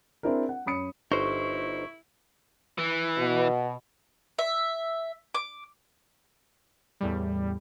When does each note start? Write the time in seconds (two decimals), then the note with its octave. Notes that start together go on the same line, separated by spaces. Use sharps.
0.23 C4 D4 E4 G#4 A#4
0.49 F#5
0.66 F#2 C#5 B5 D#6 C#7
1.12 G1 D#4 E4 C5 C#6
2.79 E3
3.17 B2
4.39 E5
5.35 D6
7.01 E2 A2 G3